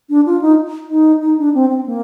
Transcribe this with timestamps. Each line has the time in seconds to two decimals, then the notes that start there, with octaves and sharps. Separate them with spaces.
0.10 D4
0.26 F4
0.41 D#4
0.90 D#4
1.21 D#4
1.38 D4
1.54 C4
1.70 C4
1.86 A#3